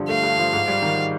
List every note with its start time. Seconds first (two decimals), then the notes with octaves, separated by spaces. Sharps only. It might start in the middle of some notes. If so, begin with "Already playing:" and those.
Already playing: G2 D3 F3 G3
0.09 A3 F5
0.23 G2
0.38 F3
0.53 G#2
0.68 G3
0.82 D#3